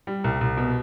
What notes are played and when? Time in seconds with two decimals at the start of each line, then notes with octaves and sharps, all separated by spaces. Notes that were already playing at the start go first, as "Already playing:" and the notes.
0.07 G3
0.24 C2
0.41 C2
0.57 B2